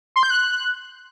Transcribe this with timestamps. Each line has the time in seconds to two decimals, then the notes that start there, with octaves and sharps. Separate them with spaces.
0.16 C6
0.23 G6
0.30 F#6